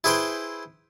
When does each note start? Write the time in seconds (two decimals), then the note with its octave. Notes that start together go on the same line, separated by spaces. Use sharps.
0.04 E4 G#4 B4 C5 G5